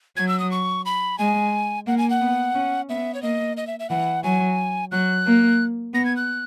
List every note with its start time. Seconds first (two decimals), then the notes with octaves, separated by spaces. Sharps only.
0.17 F#3 G#6
0.28 E6
0.39 D#6
0.51 C#6
0.85 B5
1.18 G#3 G#5
1.87 A#3 F#5
1.98 G#5
2.10 F#5
2.21 B3
2.54 C#4
2.89 B3 E5
3.14 C#5
3.22 A#3 D#5
3.57 D#5
3.67 E5
3.79 E5
3.90 E3 F#5
4.24 F#3 G#5
4.91 F#3 F#6
5.26 A#3
5.94 B3 A#6
6.05 G#6
6.16 F#6